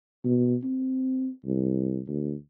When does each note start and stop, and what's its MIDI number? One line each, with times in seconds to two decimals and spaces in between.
0.24 0.56 47
0.64 1.29 60
1.45 2.01 36
2.08 2.35 38